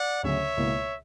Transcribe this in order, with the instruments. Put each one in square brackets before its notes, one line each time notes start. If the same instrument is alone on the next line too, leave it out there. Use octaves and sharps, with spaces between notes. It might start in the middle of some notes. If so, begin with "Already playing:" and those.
Already playing: [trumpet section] D5 F#5
[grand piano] D2 C#3 F#3 C#4 [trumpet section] C#5 E5
[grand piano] C#2 B2 A#3 E4